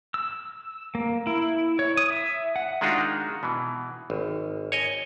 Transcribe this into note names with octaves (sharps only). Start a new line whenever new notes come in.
E6
A#3
E4
C#5
D#6
E5
F#5
D#3 G#3 D4 D#4 F4 F#4
B2 E3
G#1
C#5 D#5 G#5